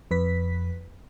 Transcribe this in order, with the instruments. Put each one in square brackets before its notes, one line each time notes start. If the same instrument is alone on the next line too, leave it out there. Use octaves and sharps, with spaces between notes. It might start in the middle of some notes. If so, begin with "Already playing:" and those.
[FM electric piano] F2 B4 B6